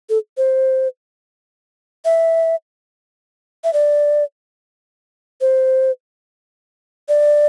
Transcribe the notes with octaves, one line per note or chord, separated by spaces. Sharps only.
A4
C5
E5
E5
D5
C5
D5